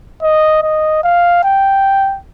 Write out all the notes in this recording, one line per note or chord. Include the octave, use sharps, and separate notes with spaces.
D#5
D#5
F5
G5